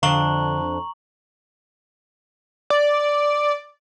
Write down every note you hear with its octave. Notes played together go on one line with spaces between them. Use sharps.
F2 D3 D4 F5 A#5 C#6 F#7
D5